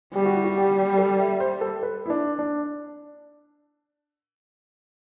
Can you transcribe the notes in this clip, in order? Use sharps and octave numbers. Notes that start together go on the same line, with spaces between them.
G3 G4
F#4
E4
F#4
G4
G4
A4
E5
C5
A4
B4
E4
D4
D4